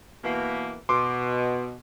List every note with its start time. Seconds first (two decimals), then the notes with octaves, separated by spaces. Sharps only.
0.24 B2 E3 A#3
0.89 B2 C6 D6